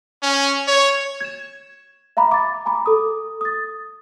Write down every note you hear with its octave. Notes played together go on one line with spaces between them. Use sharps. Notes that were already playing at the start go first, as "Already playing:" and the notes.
C#4
C#5
G#6 E7
E5 F5 A#5 B5 D6
D6 A6
G#5 A#5 B5 D6
A4 D#6
D#6 A6